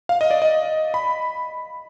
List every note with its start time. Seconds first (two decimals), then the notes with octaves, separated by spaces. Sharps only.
0.09 F5
0.21 D#5
0.31 D5
0.42 D#5
0.94 B5